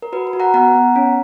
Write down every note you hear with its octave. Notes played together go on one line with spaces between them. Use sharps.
A#4
F#4 B4
B4
F#4
F#5 A#5
B3 F#5 A#5
B3
C#4